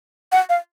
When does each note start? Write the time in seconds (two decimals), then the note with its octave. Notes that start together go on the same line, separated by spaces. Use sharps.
0.32 F#5
0.49 F5